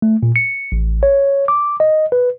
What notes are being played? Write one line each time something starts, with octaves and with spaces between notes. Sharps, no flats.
A3
A#2
C#7
A1
C#5
D6
D#5
B4